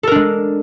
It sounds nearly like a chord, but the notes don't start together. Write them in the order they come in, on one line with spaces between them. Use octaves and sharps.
A4 A#4 D4 G#3